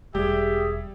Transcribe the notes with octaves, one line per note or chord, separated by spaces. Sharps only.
E1 G3 G4 G#4 E5